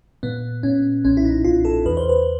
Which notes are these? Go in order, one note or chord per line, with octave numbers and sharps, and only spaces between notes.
A#2 B3
A#2 C#4
B1 C#4
E4
D#4
B1 F4
A4
E2 B4
C5
B4